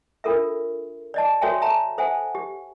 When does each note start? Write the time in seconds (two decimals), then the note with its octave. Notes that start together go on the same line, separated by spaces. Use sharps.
0.24 D4 F4 A4 A#4 E5
1.14 D5 D#5 A5
1.41 F#4 A4 C#5 E5 G5 G#5
1.61 C#5 E5 A5 A#5
1.98 A4 C5 E5 F#5 G#5
2.35 G4